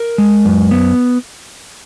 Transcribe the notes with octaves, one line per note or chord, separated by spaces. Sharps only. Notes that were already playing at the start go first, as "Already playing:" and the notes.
Already playing: A#4
G#3
F#2
B3